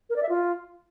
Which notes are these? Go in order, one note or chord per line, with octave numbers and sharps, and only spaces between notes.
A#4
D5
E5
F4